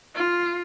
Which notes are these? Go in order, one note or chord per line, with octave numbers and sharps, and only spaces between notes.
F4